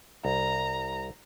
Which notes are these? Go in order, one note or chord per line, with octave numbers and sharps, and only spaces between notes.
C2 A#5